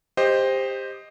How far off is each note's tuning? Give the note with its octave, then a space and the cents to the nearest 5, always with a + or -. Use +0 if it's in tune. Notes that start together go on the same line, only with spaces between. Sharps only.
G4 +20 C5 +5 D#5 +0